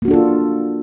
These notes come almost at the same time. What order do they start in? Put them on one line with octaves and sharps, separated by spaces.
A#3 F#4 D4 A4 F4